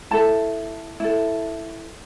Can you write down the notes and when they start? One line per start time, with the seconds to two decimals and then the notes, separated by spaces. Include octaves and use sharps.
0.11 E4 A4 A5
1.00 E4 A4